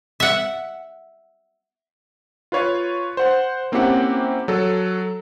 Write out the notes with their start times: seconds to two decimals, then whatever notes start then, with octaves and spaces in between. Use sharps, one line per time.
0.20 E5 F#5
2.52 F4 B4 C#5 F5
3.17 C5 F#5
3.72 A#3 C4 C#4 E4 G4 F#5
4.48 F#3 A4